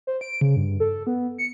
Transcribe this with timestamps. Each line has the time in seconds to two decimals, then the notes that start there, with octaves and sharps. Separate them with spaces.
0.07 C5
0.21 D7
0.41 C#3
0.56 G2
0.80 A4
1.07 B3
1.38 C#7